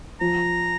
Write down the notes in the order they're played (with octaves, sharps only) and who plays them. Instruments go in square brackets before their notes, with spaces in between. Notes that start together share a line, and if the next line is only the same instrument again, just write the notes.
[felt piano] F3 [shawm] A#5